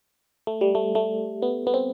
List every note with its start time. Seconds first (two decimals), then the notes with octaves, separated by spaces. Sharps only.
0.47 A3
0.61 G3
0.75 A3
0.95 A3
1.42 B3
1.67 B3
1.74 C4